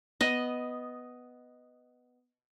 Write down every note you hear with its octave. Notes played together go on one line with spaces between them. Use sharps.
B3 D#5